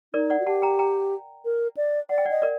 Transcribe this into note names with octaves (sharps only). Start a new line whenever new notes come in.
D#4 A#4 D5
D5 F#5
F#4
G4 F#5 A5
G5 A#5
G5 A#5
A#4
D5
D5 F#5
G5
D5 F#5
D#5
A#4 D5